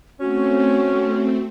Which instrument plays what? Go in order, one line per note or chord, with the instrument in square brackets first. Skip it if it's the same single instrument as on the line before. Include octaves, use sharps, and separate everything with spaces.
[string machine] A3 C4 [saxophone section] C#4 [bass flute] F#4